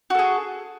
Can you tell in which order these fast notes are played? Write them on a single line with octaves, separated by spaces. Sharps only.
F#4 A4 G#4